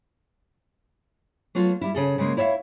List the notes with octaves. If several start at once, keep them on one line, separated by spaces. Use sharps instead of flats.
F#3 A3 B3 F4
G3 E4
C#3 G#4 A4
C#3 G#3 A#3
E4 C#5 D5 E5 F5